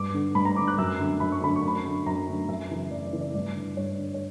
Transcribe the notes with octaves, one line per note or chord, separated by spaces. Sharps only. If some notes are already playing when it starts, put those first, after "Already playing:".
Already playing: G2 D6
D3
G2 B5
A#5
D3 D6
F#6
F#2 E6
D3
F#2 B5
C#6
D3 B5
C#6
F#2
B5
D3
F#2 A#5
D3
F#2 E5
C#3 E3
F#2 D5
D5
C#3 E3
D5
G2 D5
D3
G2 C#5
D3
C#5